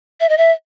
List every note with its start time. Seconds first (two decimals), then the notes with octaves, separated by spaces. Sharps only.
0.20 E5
0.29 D#5
0.37 E5